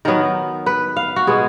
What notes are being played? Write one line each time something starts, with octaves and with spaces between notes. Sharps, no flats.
D#3 F#3 B3 A#4
B4
F5
F#4
B2 G#3 B3 G#4